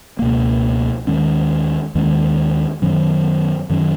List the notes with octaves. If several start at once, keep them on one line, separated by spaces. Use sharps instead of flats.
C#2 B2 A#3
D#2 D#3 G#3 C#4
D#2 D#3 G#3 C#4
F#2 D#3 F#3 C#4
F#2 D#3 F#3 C#4